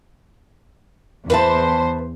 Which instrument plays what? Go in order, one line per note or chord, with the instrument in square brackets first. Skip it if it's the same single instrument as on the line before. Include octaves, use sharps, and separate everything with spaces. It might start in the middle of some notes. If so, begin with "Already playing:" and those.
[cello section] E2 C5 [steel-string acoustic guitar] B4 E5 A5